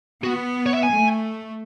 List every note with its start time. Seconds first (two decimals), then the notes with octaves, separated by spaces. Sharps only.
0.24 B3 F#4
0.66 C#5
0.74 E5
0.83 G#5
0.91 A3